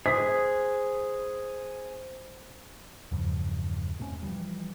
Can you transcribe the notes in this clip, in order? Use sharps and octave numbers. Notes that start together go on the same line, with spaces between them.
G#4 C5 D#6 B6
E2 G2 C#3 F3
B2 A3 C4 C#4
E3 F3 G3